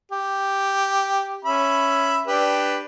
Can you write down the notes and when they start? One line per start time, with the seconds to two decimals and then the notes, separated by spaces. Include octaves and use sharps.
0.12 G4
1.45 C#4 E5 B5
2.27 D4 G4 B4